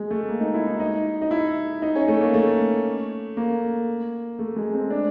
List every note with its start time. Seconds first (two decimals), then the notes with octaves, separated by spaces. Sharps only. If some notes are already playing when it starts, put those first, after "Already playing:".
Already playing: G#3
0.10 A3
0.28 A#3
0.40 D#4
0.54 E4
0.67 D#4
0.80 D#4
1.22 D#4
1.31 E4
1.82 D#4
1.95 C#4
2.08 A3
2.20 A#3
2.34 A3
3.37 A#3
4.39 A3
4.56 G#3
4.73 C4
4.90 D4